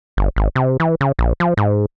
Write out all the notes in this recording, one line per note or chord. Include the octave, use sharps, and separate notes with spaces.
G1
G#1
C3
E3
C#3
A#1
F3
G#2